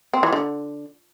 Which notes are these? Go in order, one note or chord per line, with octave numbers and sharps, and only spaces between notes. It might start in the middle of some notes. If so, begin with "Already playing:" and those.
C4
E3
D3